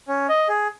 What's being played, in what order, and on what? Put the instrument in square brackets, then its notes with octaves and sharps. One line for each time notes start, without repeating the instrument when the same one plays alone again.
[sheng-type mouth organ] C#4
D#5
G#4